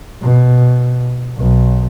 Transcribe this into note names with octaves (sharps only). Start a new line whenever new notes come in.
B2
B1